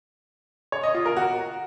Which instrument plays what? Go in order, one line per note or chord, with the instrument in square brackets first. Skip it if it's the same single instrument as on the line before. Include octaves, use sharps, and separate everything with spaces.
[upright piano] C#5
D#5
F4
A#4
F#4